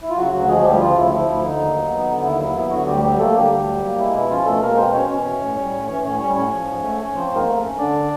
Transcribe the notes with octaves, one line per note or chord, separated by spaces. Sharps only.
E4
F4
C#3 F#3 F#4
D2 F#3 F#4
F3 G#3 G#4
D2 G3 G4
C#3 F3 F4
D2 E4
F3 E4
D2 E4
D3 D#4
D#2
F#3
B3
D3
D#2 E4
F#3 E4
B3 E4
D3 F#3 F#4
D2 G3 G4
F#3 G3 G4
A3 A#3 A4
D3 G3 G4
D2
F#3
A#3
G#3 E4
B2 E4
F3 C#4 F4
B2 A3 A4
G#3 A#3 A#4
B2 C4 C5
C5
C#4 C#5
B2 C#4 C#5
E3
A2
G3
A2
E3 C#4 C#5
A2 C#4 C#5
G3 C#4 C#5
A2 C#4 C#5
F3
G#2
A3
C#4
F3 C4 C5
G#2
A#3 A#4
A3
C#4
D3 D4 D5